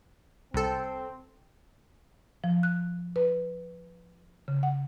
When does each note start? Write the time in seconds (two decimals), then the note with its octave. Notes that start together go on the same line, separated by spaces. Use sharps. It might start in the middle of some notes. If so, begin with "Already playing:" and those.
0.54 C2 C4 A4
2.44 F3
2.63 F#6
3.16 B4
4.48 C#3
4.63 F#5